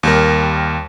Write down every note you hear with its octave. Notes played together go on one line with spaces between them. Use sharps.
D#2 G3 A#4